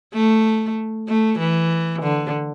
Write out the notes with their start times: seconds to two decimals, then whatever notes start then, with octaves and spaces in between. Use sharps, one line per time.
0.14 A3
1.08 A3
1.39 E3
2.02 D3